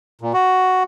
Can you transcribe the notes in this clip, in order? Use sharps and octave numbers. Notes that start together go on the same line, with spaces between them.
A#2
F#4